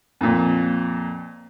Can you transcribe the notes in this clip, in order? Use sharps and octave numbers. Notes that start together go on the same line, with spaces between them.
F2 A#2